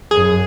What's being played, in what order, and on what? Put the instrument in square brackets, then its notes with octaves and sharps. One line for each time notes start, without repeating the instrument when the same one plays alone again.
[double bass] F#2 [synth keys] G#4